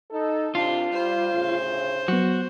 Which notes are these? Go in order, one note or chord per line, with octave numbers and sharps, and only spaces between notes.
D#4 A4
C2 C3 D4 F4
G3 C5
D2 A2 C#3
F#3 B3 F#4